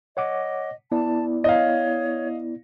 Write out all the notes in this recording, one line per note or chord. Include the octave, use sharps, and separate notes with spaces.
C#5 D#5 F#5 D6
B3 E4 D5 A5
C#5 D#5 F5